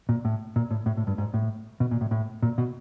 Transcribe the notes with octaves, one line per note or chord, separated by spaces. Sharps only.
A#2
A2
A#2
A2
A2
A2
G2
G#2
A2
B2
A#2
A2
A2
A#2
B2